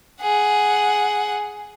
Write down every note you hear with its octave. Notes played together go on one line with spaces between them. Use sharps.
G#4 F#5